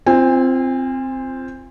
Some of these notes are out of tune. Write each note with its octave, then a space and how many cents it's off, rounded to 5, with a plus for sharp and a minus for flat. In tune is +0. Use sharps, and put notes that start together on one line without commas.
C4 +0 F4 -20 G#5 -40